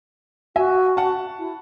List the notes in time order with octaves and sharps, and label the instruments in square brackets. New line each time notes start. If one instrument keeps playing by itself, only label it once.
[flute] F#4 [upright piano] E5 G#5
[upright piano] F#5 A5
[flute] E4